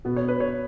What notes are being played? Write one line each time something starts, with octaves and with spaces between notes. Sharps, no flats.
B2 B3
C#5
B4
C#5